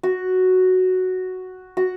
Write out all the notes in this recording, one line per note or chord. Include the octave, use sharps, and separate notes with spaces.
F#4
F#4